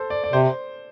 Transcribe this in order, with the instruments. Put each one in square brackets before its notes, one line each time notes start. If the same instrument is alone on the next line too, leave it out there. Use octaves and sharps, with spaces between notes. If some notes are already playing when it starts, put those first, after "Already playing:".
Already playing: [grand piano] A4 C5
D5
D5
[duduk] C3 [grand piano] C5